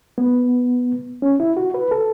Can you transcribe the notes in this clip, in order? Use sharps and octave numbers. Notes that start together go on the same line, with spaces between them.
B3
C#4
E4
F#4
B4
A4